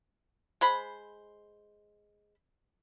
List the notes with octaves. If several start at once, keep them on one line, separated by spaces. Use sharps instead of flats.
G#3 C5 B5